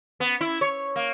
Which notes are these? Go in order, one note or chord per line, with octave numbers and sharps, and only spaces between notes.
B3
E4
C#5
A#3